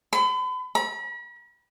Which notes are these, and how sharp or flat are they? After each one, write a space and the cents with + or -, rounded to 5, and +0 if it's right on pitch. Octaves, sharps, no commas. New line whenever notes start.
B5 +40
B5 -45